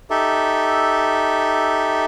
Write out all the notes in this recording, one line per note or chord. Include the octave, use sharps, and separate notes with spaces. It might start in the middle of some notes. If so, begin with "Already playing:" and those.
D#4 G4 A4 E5